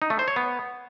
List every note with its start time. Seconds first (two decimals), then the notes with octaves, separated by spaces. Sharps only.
0.02 D#4
0.10 A3
0.19 C5
0.28 C#5
0.36 B3